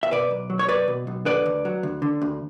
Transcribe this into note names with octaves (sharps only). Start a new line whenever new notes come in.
E5
B2 B4 D5
B1
F#3
C#5
B1 B4 D5
B2
B1
D3 B4 D5
D2
F#3
D2
D3
D2